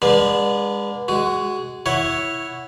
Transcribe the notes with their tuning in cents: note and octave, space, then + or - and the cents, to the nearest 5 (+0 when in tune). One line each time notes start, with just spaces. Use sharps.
G#3 -30 B3 -30 D4 +0
G#3 +0 F#4 +10
E4 +0 C#5 +0 F#5 +0